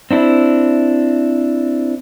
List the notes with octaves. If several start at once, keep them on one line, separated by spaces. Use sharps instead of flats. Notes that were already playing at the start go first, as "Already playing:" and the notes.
C4 D4 E4